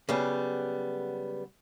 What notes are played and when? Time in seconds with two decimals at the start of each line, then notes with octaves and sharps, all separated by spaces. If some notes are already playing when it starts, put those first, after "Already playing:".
0.09 C#3 F#3 G3 B3